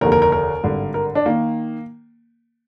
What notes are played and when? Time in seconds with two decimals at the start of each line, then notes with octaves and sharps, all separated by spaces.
0.01 F1 D#2 D3 A#4
0.12 A#4
0.22 A#4
0.32 A#4
0.64 G#1 G2 D3
0.94 A#4
1.15 D4
1.26 D#3 A#3